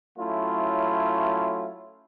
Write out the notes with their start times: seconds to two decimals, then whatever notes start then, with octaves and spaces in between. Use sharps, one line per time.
0.18 F#3 A3 C#4 E4 F4